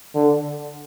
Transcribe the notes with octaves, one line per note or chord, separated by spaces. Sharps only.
D3